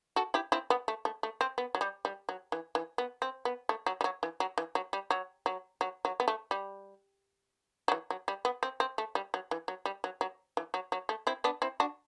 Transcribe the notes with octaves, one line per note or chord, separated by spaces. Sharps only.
F#4 A4
E4 G4
C4 E4
B3
A3
A3
A3
C4
B3
F#3
G3
G3
F#3
E3
E3
B3
C4
B3
A3
F#3
G3
F#3
E3
F#3
E3
F#3
G3
F#3
F#3
F#3
F#3
B3
A3
G3
F#3
E3
F#3
G3
B3
C4
C4
A3
G3
F#3
E3
F#3
G3
F#3
F#3
E3
F#3
F#3
A3
C4 E4
B3 D4
C4 E4
D4 F#4